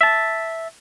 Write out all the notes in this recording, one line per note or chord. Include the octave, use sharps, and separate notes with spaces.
E5 A5